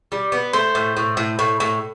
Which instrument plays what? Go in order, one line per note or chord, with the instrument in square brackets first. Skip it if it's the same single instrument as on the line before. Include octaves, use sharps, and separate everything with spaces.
[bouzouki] G3
B3
[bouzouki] A3 [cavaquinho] C5
[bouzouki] A2
A2
A2
A2
A2